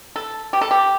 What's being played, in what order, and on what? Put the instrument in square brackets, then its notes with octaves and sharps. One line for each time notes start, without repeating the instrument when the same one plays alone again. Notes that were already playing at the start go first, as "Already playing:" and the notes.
[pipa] A4
G4
A4
G4